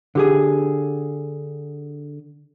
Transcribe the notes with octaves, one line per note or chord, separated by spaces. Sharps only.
D3 G4 G#4